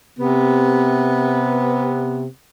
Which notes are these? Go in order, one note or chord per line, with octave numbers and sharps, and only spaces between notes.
C3 B3